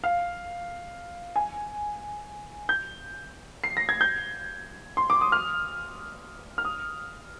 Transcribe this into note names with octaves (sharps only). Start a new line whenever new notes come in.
F5
G#5
G6
C7
A#6
G#6
G6
C6
D6
D#6
F6
F6
D#6